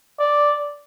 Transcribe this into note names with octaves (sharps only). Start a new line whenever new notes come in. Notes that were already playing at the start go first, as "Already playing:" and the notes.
D5